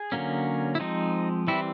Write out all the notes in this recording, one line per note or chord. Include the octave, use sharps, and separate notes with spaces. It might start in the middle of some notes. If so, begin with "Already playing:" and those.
Already playing: G#4
D3 F#3 A#3 C#4
E4
F3 G#3 C4 D#4
E3 G3 C4 E4